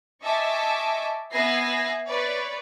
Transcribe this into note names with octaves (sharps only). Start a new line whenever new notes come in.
D#5 E5 G#5 A5 C#6 D6
B3 B4 E5 G#5 A#6 C7
B4 C#5 D5